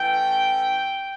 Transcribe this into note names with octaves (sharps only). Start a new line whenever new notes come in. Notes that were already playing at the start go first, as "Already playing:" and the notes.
Already playing: E3 A3 C#4 G5